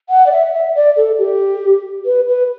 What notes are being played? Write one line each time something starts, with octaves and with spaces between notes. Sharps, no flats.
F#5
D5
E5
E5
D5
A4
G4
B4
B4